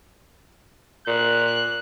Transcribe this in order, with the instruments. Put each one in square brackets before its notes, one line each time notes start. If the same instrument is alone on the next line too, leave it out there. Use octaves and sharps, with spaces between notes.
[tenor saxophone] A#2 [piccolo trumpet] F#6